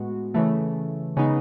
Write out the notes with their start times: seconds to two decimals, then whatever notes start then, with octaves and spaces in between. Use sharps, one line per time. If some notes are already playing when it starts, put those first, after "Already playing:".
Already playing: A2 G#3 B3 F#4
0.34 C#3 E3 A3
1.17 C#3 G#3 B3 D#4